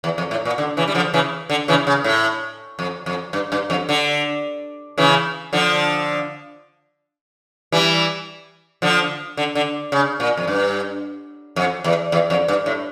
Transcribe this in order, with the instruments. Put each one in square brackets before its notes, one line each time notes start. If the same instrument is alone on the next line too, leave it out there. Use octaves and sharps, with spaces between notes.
[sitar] E2
F2
A2
A#2
D3
C#3 E3
G3
D3 F3
C#3 E3
D3
C#3 E3
C#3
A2
F2
F2
G2
G2
F2
D3
C#3 E3
D3 F3
E3 G3
D3 F3
D3
D3
C#3
A#2
F2
G2
F2
E2
E2
F2
G2
A2